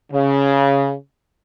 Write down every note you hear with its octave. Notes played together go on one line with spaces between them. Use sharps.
C#3